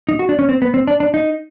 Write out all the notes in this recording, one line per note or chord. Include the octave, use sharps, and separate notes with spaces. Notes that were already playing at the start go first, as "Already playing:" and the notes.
D#4
F#4
D4
C#4
C4
B3
C4
D4
D4
D#4